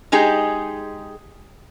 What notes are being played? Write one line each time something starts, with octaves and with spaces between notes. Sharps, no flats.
G#3 D#4 G4 G#4